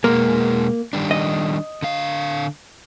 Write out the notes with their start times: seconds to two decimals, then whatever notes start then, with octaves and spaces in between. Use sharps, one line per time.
0.04 B2 G#3 A#3 G#4
0.93 D#3 G3 D4
1.11 D#5
1.82 D3 F5